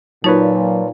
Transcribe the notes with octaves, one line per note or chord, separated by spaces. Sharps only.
A#2 F#3 D#4 B4 C#5 A5